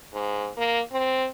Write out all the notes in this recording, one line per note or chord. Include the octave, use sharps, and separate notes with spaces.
G#2
A#3
C4